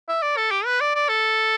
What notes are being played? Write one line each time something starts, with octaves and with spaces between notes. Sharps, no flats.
E5
D5
A4
G4
B4
D5
D5
A4